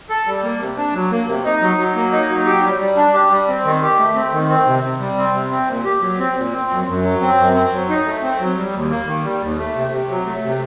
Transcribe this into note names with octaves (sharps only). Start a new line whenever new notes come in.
A4
G3
A#3
C3
D4
F#3
A#3
C3
D#4
F#3
F#3
A#3
D#4
F#3
G4
G3
G3
D4
G4
G3
C4
D#3
G4
A3
C4
D#3
C4
C3
C3
G3
C4
C3
C4
A#2
G4
F#3
C4
A#2
C4
F#2
F#2
F#3
C4
F#2
C4
F#3
D#4
A3
C4
F#3
G3
D#2
A#3
D#3
G3
D#2
A3
C3
C3
F#3
A3
C3